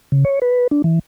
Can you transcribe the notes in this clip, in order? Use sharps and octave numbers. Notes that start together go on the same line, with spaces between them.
C#3
C#5
B4
D4
E3